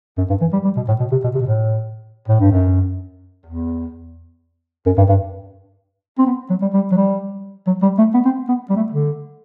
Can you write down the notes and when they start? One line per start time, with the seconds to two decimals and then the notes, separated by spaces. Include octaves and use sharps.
0.18 F#2
0.30 G2
0.41 E3
0.53 G3
0.65 G3
0.77 B2
0.88 A2
1.00 B2
1.12 C3
1.24 B2
1.35 C3
1.41 B2
1.47 A2
2.28 A2
2.40 G2
2.52 F#2
3.46 E2
4.86 F#2
4.98 G2
5.09 G2
6.19 C4
6.27 B3
6.50 F#3
6.62 G3
6.73 G3
6.92 F#3
6.97 G3
7.67 F#3
7.82 G3
7.98 A3
8.14 B3
8.25 C4
8.49 B3
8.70 G3
8.76 A3
8.92 D3